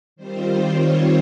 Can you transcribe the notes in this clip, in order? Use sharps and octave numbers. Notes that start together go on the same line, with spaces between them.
D#3 G3 C4 F4 C5
C#5